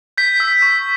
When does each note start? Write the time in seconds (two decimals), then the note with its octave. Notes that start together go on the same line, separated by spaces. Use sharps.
0.18 G6 B6
0.40 E6
0.62 C#6